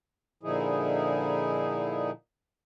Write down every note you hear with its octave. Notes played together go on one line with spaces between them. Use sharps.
A#2 D3 F3 D#4 E4 G#4